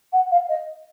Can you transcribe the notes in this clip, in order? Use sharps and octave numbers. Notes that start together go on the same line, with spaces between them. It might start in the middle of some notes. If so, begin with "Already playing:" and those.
F#5
F5
D#5